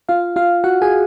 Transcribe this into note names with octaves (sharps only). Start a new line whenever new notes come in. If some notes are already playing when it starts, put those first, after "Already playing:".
F4 F5
F4 F5
F#4 F#5
G#4 G#5